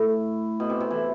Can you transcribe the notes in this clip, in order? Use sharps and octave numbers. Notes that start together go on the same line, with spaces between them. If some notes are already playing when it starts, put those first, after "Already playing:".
Already playing: A2
B2
C3
C3
E3